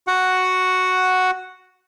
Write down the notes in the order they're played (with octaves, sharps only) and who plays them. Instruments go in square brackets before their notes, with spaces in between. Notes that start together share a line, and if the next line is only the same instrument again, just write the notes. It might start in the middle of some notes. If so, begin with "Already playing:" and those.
[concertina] F#4 F#5